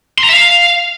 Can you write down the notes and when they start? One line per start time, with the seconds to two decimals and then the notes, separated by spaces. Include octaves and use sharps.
0.18 C6
0.23 A#5
0.29 E5
0.34 F5